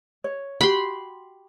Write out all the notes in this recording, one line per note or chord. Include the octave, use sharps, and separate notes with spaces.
C#5
F#4 G4 B5 C6